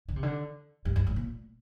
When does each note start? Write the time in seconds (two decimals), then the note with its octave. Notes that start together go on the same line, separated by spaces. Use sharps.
0.08 D3
0.16 C3
0.23 D3
0.85 G2
0.96 G2
1.07 A2
1.16 A#2